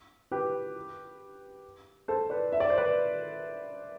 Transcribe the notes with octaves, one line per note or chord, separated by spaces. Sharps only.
G4 B4
A4 C5
B4 D5
E5
D5
C5
B4 D5